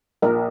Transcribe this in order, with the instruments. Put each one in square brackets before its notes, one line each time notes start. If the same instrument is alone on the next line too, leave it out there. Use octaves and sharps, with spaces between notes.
[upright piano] A#1 [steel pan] A#4